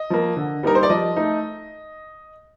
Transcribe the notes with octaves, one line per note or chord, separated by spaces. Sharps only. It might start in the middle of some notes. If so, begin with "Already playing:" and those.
Already playing: D#5
F3 A#3
D3
G3 A#3 D#4 A#4
C5
D5
F3 D#5
A3 D#4